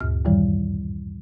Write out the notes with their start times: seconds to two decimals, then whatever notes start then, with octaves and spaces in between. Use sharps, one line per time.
0.01 D2 G2 A#2 F6
0.25 F#2 A2 D#3 E3 G3